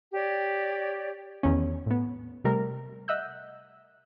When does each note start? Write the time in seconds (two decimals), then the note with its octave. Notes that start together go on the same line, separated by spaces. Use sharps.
0.13 G4 C#5 D5
1.43 E2 D#3 C#4
1.86 A2 B3
2.44 C3 G3 A3 A#4
3.08 D#5 E5 F#5 E6 F#6 G6